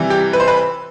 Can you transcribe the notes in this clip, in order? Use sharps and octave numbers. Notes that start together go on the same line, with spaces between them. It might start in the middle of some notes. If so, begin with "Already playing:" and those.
Already playing: C3 E3 G3
G4
B4
C5
B4